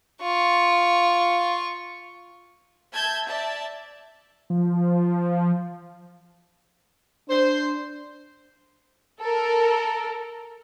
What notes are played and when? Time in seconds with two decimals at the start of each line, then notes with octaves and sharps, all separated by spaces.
0.21 F4 C#6
2.93 E5 A5 G6 G#6
3.27 D5 E5 A5
4.50 F3
7.30 D4 C5
9.20 A4 A#4